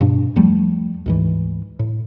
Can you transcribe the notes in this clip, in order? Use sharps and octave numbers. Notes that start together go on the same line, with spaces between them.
G2 B2 D4
E2 F3 G3 A3
D2 G#2 E3
A2